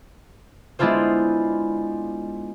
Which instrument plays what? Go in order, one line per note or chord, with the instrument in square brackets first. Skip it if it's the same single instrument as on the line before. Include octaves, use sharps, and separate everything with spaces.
[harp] G#3 B3 D4 E4 F4 C5